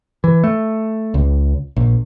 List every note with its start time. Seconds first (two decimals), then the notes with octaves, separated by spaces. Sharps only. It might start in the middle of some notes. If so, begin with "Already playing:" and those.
0.24 E3
0.44 A3
1.14 C#2
1.76 A#1